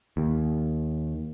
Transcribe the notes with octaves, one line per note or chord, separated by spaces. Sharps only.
D#2